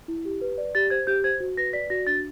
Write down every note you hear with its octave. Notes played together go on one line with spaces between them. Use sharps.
E4
G4
B4
D5
G4 A6
C5 G#6
G4 G6
C5 G#6
F#4
B4 A#6
D5 B6
F#4 A#6
D4 A6